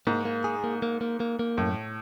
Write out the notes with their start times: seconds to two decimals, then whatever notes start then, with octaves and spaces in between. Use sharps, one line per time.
0.07 G#2 A#3
0.25 A#3
0.44 G#4
0.64 A#3
0.82 A#3
1.01 A#3
1.20 A#3
1.39 A#3
1.58 F#2 A2